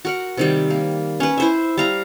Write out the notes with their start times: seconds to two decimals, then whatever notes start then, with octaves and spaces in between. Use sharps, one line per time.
0.05 F#4 A#4 F#5
0.37 C3 D#3 G3
0.70 A#3
1.20 C#4 B4
1.38 E4 C5 E5
1.78 G3 F5 A#5